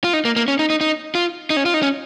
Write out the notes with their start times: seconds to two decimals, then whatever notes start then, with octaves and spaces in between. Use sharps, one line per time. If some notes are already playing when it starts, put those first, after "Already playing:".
0.04 F4
0.13 D#4
0.25 A#3
0.36 A#3
0.48 C#4
0.59 D#4
0.70 D#4
0.81 D#4
1.15 F4
1.50 D#4
1.57 C#4
1.66 F4
1.74 D#4
1.82 C#4